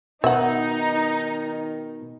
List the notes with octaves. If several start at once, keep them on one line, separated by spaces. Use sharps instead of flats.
B2 D#3 D#4 E5 F#5